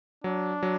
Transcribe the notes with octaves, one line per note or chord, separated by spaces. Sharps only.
F#3 D4
F#3